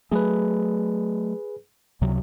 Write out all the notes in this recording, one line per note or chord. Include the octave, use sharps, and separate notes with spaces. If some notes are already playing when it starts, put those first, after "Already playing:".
F#3 A3 G#4 B4
C#2 C3 F#3